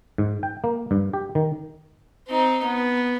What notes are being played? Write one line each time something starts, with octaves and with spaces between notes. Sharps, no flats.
G#2
G5
A#3
G2
G4
D#3
C4 D#4
B3